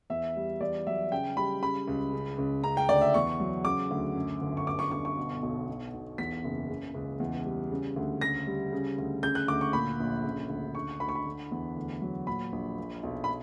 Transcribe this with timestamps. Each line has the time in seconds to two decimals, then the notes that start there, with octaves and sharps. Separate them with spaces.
0.10 E2 E5
0.36 G3
0.60 E2 D5
0.87 F#3 E5
1.11 C#3 G5
1.36 G3 B5
1.62 C#3 B5
1.88 C#2
2.13 C#3
2.38 C#2
2.63 C#3 A#5
2.77 G5
2.89 D2 D5
3.01 E5
3.14 E2 C#6
3.40 F#3
3.65 C#3 D6
3.91 D2
4.15 F#2
4.42 G1
4.57 C#6
4.66 G2 D6
4.79 C#6
4.91 G1 C#6
5.05 C#6
5.17 B2
5.42 B1
5.69 B2
5.94 B1
6.18 E2 B6
6.44 F#1
6.69 C#3
6.95 C#2
7.20 E2
7.45 G3
7.71 C#3
7.96 D2
8.21 C#3 A#6
8.47 G3
8.73 C#3
8.98 D2
9.23 C#3 G6
9.35 F#6
9.48 D2 D6
9.61 C#6
9.73 A#2 B5
10.00 A#1
10.24 C#3
10.50 D2
10.75 D3 C#6
11.00 D2 B5
11.09 C#6
11.15 B5
11.26 D3
11.52 E2
11.77 D2
12.02 F#3
12.27 A#2 B5
12.52 A#1
12.77 A#2
13.03 B1
13.24 B5